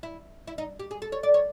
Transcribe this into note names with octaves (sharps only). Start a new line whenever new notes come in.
E4
E4
D#4
G4
G#4
A4
C#5
D5
C#5